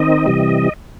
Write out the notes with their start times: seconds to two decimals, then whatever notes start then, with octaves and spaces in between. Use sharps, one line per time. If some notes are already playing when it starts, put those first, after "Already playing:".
Already playing: D#3 C4 D#4 D#5
0.26 C3 E3 G3